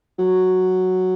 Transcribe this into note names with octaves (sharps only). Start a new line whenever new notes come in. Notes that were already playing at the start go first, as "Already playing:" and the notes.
F#3